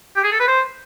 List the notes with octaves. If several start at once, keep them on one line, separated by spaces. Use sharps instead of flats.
G4
G#4
A4
B4
C5